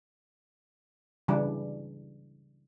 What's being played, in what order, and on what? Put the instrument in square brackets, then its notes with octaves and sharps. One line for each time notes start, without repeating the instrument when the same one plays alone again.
[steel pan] C#3 E3 G3 D4